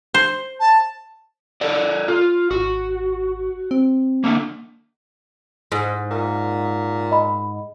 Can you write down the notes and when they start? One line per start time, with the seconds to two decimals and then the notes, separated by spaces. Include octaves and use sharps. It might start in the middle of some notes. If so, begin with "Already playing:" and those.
0.14 C5
0.60 A5
1.61 A4 A#4 D5
2.08 F4
2.51 G#1 F#4
3.71 C4
4.24 D3 A3 A#3
5.72 G#2
6.11 A#2
7.11 D#5 B5